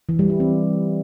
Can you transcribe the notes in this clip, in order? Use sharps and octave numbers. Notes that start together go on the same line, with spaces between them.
E3
G3
E4
C4